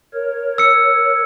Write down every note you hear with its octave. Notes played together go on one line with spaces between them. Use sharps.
A#4 C#5
E6 C#7